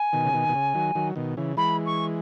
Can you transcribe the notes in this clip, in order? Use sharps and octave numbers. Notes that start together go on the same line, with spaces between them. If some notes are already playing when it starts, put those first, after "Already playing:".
Already playing: G#5
B2 D#3
C#3
B2 D#3
B2
C#3
D#3 F#3
D#3 F#3
B2 D#3
C#3 E3
E3 G#3 B5
C#6